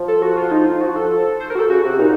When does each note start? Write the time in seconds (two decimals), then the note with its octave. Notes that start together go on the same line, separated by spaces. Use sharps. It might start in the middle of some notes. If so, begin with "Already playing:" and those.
Already playing: F3
0.08 A4
0.22 F#4
0.37 F4
0.51 D#4
0.66 F4
0.81 F3 F#4
0.96 A4
1.40 C5
1.50 A#4
1.55 F#4
1.59 A4
1.69 C#3 F#4
1.84 C3 F#4
1.99 A#2 D#4